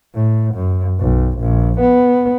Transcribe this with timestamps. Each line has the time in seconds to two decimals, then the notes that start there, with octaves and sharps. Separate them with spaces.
0.15 A2
0.54 F#2
1.00 B1
1.39 A#1
1.80 B3